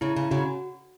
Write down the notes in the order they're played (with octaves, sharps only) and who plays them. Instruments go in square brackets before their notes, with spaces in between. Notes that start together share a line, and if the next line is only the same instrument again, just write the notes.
[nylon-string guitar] C#3 [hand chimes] E4
[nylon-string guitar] C#3
[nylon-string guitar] C#3 [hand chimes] F#4